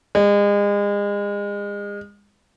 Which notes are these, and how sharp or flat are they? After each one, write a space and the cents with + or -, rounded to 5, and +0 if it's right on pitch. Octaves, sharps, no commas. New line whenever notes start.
G#3 -35